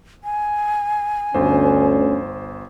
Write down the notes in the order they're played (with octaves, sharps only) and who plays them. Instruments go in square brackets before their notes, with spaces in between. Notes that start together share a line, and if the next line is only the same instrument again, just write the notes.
[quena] G#5
[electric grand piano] G1 C5 [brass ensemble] D2 [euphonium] C#4